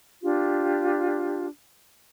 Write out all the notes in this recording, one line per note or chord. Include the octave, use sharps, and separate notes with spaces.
D4 F4 G4